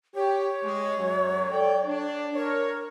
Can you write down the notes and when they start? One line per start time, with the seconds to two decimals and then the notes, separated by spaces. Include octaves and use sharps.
0.15 G4 C#5
0.63 G#3
0.99 F#2 F#3
1.50 A4 D5 G5
1.86 D4
2.35 A#4 C#5